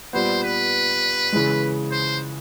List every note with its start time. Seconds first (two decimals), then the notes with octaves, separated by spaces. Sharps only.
0.13 A#2 G3 B3 C5
0.43 B4
1.33 C#3 E3 G#3
1.92 C5